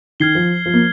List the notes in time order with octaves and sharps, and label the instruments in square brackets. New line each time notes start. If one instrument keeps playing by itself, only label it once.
[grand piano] D#3 [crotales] F6 G#6 C7 G7
[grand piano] F3
F3
A#3